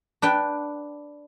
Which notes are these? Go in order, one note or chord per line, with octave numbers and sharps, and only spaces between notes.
D4 B4 G5